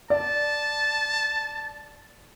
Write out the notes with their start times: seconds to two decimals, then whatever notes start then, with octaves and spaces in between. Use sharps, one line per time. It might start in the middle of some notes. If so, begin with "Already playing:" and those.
0.10 D5 A5